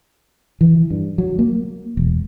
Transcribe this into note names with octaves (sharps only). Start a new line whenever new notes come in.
E3
G2
F#3
A#3
E1